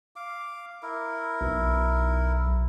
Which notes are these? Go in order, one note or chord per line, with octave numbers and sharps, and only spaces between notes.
F5 D6
E4 A#4
B1